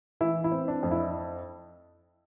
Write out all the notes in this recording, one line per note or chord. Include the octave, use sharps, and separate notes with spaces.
E3 E4
E4
C4
D4
F2
E4